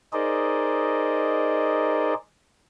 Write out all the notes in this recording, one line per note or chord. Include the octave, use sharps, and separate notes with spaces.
D#4 G#4 A#4 C5 D5 D#5